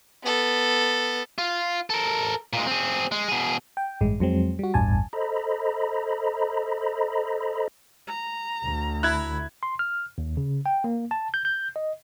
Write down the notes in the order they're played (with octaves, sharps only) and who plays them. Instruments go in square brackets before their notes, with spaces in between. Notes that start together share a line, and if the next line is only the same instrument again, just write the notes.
[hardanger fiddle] B3 A4
[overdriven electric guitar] F4
A4 A#4
A#2 G#3
C4 G#4
G#3
B2 G#4
[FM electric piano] G5
A1 G2 G#3
F2 F#3 G#3 C4
G3 F#4
A1 E2 G2 G#5 A5
[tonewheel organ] A4 C5 D#5 A#5 B5
[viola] A#5
[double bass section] D2
[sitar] E4 [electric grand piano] F#6 G#6
[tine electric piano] C6
F6
D#2
C#3
G5
A#3
A5
G6
G6
D#5